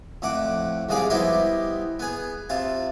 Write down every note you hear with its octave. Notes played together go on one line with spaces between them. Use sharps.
F2 A2 F#5 D6
C2 G#2 F3 G#4 D5 D6
G3 B3 E4 G4 C5 D#5
B3 G#4
C3 F4 A5